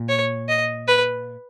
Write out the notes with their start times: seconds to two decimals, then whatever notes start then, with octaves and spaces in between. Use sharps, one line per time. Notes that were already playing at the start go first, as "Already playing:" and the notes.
Already playing: A#2
0.09 C#5
0.48 D#5
0.88 B4